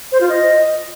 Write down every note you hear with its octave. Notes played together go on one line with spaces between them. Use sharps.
C5
F4
D#5